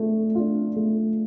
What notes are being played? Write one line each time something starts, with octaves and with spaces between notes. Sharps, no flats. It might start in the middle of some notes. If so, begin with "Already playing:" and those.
Already playing: A3 D4 F4
D4 F4
A3